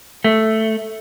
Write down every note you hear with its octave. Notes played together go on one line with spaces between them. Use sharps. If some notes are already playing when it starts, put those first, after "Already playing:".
A3